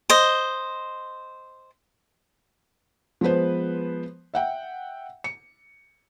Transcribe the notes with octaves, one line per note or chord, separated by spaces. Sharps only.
C5 D#5
F3 G#3 B3 B4 C5
E5 F#5 G5
C#7